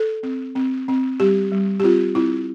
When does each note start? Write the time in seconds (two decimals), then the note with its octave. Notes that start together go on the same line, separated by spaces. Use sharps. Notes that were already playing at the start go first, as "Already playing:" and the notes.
Already playing: A4
0.23 C4
0.55 C4
0.88 C4
1.20 G3 G4
1.52 G3
1.80 G4
1.83 C4 F4
2.15 C4 E4